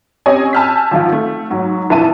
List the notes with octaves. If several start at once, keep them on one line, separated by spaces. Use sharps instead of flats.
C4 C#4 G4 C#5 D#5 G#5
G#5 A5 E6 F6 G6 B6
G#1 F3 F4
A3
G#2 F#3
A#1 F2 E3 E5 A5 D#7